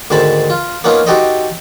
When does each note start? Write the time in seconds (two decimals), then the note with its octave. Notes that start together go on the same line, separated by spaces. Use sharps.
0.10 D2 G#2 D#3 C5 A5 B5
0.50 F4
0.84 A#3 B3 C#4 D#4 F4
1.07 D#4 F#4 G4 A4 C5 D#5